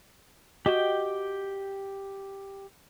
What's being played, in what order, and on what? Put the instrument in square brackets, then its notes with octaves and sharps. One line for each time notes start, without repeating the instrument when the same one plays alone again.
[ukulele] F#4 D#5 [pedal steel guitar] G4 G5